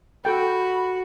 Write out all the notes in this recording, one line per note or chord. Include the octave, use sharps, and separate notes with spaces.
F#4 A4 G5 B5